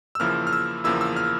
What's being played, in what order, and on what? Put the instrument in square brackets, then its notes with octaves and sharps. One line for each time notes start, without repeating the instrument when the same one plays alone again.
[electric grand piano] E6
E2 C#3 F3 A#3 E4 F6
F6
E6
E2 C#3 F3 A#3 E4 E6
E6
F6